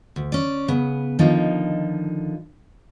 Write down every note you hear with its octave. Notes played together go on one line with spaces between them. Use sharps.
D2
C#4 D5
C#3 B3
D3 D#3 F3 D#4